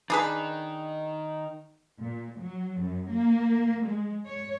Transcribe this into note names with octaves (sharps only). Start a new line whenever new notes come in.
D#3 D4 G#4 B4
A#2
F#3
F#2
A#3
G#3
C#5